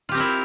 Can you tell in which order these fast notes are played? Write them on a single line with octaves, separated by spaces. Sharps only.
F4 G4 C4 A#4 E4